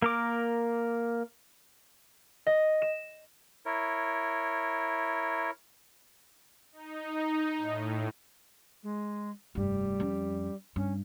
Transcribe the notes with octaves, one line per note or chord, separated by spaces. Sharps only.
A#3 A#4 D6
D#5
E7
E4 A#4 C#5
D#4
A2
G#3
F1 G2 G3
F2 C#4
G2 C#4